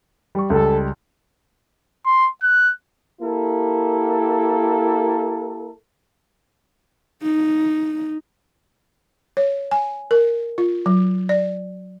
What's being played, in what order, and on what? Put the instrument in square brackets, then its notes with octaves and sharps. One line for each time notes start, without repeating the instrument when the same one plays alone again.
[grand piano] G3 C#6
[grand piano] C#2 G3 [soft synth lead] A4
[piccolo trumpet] C6
F#6
[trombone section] A#3 E4 G4 A4 A#4
[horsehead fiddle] D#4
[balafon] C#5
G#5
A#4
F4
F#3
D5